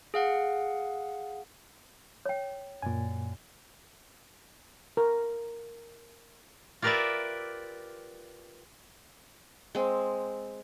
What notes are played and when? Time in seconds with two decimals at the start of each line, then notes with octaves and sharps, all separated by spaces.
0.14 G#4 F5 F#5
2.26 C#5 G5
2.82 F#2 A#2 D5 G#5
4.97 A#4
6.82 F4 G4 A#4 B4 D5 E5
9.75 G#3 C4